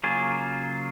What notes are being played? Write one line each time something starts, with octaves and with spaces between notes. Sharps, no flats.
C#3 F#3 A#3 F4 G#4